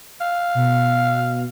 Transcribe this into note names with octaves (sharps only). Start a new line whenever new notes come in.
F5
B2